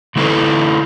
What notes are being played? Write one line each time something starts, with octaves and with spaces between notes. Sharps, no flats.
D3 A3 E4 G#4 A4 B4